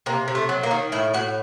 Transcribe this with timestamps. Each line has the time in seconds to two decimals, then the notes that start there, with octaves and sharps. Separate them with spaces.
0.06 C3 A#3
0.28 C3
0.35 A3
0.49 F#3
0.63 A#3
0.71 D#3
0.92 A2 E4
1.14 A2 F#4